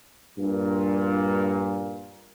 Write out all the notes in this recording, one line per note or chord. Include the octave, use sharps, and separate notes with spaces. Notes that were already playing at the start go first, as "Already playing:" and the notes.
G2 A#2